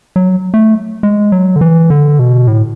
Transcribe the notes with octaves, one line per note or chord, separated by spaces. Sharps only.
F#3
A3
G#3
F#3
D3
E3
D3
B2
A2